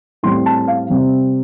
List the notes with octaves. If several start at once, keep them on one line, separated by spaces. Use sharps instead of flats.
A2 G3 C4 C6
A5
F5
C3 G3 C4